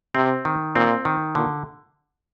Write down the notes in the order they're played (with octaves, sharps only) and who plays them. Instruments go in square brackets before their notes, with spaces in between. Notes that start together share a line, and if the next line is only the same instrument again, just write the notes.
[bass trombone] C3 [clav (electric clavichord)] C4
[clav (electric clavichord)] D#3
[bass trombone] A#2 [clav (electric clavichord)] C4
[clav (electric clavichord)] D#3
[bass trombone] A#2 [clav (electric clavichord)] D3